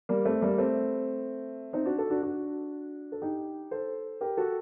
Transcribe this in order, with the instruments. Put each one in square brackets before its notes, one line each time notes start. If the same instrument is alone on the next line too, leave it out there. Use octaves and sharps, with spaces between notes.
[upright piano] G3 A#3
A3 C4
G3 A#3
A3 C4
C4 D#4
D4 F#4
F#4 A4
D4 F#4
D4 F#4
A4
D#4 G4
A4 C5
G4 A#4
F#4 A4